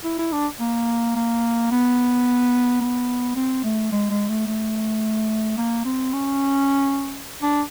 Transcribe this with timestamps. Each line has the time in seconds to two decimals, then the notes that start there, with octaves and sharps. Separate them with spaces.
0.04 E4
0.19 E4
0.32 D4
0.60 A#3
1.16 A#3
1.71 B3
2.81 B3
3.36 C4
3.64 A3
3.92 G#3
4.10 G#3
4.29 A3
4.47 A3
5.58 A#3
5.85 C4
6.13 C#4
7.43 D4